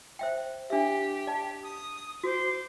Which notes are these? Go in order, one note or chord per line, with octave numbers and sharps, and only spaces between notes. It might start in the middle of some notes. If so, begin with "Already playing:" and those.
C5 E5 G5
D4 G4 E5
D5 A5
D#6
F#4 C5 D6